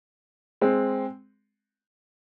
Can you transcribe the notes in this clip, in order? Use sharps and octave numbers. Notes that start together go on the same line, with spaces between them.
G#3 C4